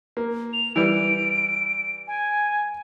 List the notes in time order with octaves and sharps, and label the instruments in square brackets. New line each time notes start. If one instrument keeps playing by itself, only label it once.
[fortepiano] A#3
[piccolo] F7
[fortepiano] E3 G3 [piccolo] D7
[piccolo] G#5